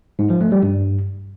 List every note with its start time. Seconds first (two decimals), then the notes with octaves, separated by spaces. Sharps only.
0.19 G#2
0.30 F3
0.41 A3
0.52 G3
0.63 G2